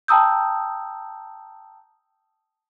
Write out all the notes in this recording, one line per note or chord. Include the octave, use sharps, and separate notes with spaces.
G5 A5 A#5 D#6 E6 G6